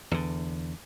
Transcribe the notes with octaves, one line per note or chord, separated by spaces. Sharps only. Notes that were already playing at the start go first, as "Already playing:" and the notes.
E2 D3